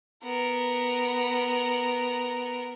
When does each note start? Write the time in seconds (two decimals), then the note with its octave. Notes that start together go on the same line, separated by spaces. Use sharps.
0.23 B3 A#4